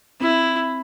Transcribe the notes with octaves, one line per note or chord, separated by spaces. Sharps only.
C4 E4